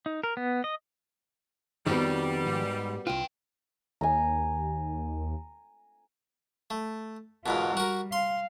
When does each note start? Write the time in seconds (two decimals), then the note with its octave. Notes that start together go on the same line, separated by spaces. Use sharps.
0.06 D#4
0.24 A#4
0.37 B3
0.64 D#5
1.87 F2 D#3 F3 G3 B3 C4 F#4 A#4
2.46 G#2
3.07 C2 F4 B4 G5
4.01 D#2 G#5 A#5
6.70 A3
7.46 E2 G#2 B2 F4 A#4
7.77 G3 F#4 A#4
8.12 F5 C6